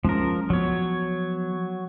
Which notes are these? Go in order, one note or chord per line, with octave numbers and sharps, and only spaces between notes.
F3 G#3 C#4 A#4
F3 F#3 B3 C#5